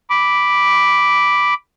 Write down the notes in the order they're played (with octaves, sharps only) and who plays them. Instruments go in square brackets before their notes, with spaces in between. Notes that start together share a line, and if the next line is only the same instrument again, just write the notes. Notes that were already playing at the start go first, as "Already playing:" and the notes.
[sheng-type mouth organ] B5 D6